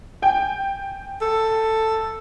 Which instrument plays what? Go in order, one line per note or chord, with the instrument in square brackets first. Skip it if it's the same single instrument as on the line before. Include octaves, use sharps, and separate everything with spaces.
[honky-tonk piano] G5 G#5
[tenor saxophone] A4